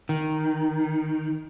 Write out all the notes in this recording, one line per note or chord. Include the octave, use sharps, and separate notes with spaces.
D#3